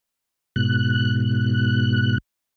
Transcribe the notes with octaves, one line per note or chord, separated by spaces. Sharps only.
G#2 B2 F#6